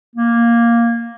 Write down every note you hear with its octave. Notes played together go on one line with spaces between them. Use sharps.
A#3